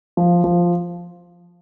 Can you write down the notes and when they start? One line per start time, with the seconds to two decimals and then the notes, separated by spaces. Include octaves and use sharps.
0.17 F3
0.44 F3